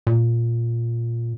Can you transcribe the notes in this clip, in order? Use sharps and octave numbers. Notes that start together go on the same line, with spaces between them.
A#2